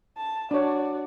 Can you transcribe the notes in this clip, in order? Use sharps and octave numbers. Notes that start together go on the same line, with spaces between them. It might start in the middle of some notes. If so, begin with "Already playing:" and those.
A5
D4 F#4 C#5 D5